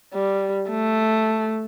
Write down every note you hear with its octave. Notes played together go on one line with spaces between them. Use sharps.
G3
A3